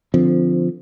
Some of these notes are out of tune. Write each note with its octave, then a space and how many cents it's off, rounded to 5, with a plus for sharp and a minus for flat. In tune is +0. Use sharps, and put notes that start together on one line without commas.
D3 +10 F3 +0 C4 -10